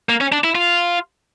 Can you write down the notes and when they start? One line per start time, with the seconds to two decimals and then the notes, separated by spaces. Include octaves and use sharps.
0.09 A#3
0.21 C#4
0.32 D4
0.44 E4
0.55 F4